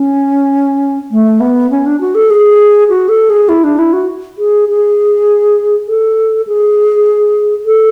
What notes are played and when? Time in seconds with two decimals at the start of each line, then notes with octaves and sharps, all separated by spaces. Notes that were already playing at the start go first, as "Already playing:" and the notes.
Already playing: C#4
1.11 A3
1.40 B3
1.71 C#4
1.86 D4
2.01 F#4
2.15 A4
2.30 G#4
2.89 F#4
3.09 A4
3.30 G#4
3.49 E4
3.64 D4
3.79 E4
3.93 F#4
4.38 G#4
4.69 G#4
5.88 A4
6.47 G#4
7.66 A4